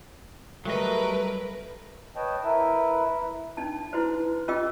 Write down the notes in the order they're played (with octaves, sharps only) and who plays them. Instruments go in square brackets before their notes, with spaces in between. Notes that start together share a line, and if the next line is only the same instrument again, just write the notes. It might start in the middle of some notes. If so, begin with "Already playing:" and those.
[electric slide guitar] F#3 G3 D#5 [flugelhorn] A3 [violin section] A#4 B4
[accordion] B4 C#5 D#5 G5 A5
E4 A#4 B4 E5
[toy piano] D4 D#4 A5
E4 F#4 B4 C5
C#4 F4 G#4 D#5 G5 E6